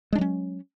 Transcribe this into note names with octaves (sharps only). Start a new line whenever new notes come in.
F#3 G#3 C#4 D4